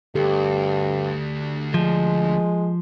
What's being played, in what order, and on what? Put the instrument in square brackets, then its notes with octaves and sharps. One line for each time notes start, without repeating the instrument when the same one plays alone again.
[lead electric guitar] D2 [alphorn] G2 [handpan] G4 A4
[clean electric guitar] F3 [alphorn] G#3